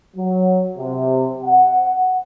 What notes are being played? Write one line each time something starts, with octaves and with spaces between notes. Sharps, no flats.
F#3
C3
F#5